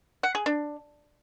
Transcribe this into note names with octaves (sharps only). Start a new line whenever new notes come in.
F#5
G#4
D4